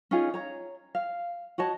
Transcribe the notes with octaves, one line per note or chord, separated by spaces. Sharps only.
C#4 D#4 F4 G#4
C#5 A#5
F5
F#4 C#5 D#5 A5